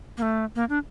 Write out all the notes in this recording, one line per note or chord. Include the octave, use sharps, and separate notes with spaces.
A#3
A3
A#3
D4